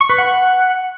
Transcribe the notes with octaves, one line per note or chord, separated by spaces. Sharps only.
C#6
B4
F#5